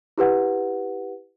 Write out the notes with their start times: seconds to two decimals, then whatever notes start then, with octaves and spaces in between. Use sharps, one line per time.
0.18 E4 G4 B4 F#5